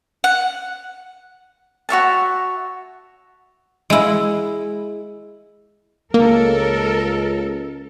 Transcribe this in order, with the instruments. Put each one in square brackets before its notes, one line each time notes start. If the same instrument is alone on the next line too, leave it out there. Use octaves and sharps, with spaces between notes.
[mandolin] F#5
[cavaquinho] F#4 C#5 E5 A5
[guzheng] G#3 E4
[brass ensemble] C#2 [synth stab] A#3 [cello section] A4 A#4